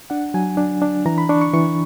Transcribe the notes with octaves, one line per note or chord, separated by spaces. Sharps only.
D4 F#5
F#3 G#5
D4
D4
E3 A#5
B5
D4 C#6
C#6
E3 C#6